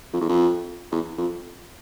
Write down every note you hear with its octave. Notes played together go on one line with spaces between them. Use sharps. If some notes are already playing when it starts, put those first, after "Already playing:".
F2
E2
F2
E2
F2